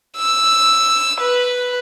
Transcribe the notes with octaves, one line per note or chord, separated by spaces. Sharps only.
E6
B4